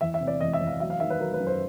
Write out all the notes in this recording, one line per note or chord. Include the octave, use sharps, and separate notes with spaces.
E2 E5
E5
C3
D5
E2 D#5
E5
E2
F5
F#3 E5
F5
D#3 E5
B4
F#3 A#4
B4
F#2
C5